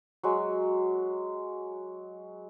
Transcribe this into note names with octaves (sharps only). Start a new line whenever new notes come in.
F#3 G#3